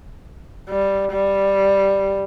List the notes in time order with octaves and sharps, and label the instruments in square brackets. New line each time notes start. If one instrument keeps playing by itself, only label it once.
[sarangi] G3
G3